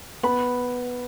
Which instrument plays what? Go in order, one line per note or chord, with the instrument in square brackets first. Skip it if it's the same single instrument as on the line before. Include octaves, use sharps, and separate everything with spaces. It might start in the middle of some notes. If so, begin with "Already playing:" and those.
[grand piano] B3 [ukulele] B5